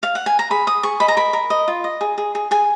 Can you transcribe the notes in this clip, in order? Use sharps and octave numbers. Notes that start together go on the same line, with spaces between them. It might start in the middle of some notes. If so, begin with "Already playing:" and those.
F5
F#5
G#5
A#5
G#4 B5
G#4 D#6
G#4 C#6
D#5 B5
A#5
A#4 B5
A#4
D#5
F4
D#5
G#4
G#4
G#4
G#4 G#5